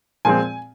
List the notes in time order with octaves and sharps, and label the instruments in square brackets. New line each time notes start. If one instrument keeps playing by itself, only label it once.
[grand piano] A#2 F3 G#3 C4 G#5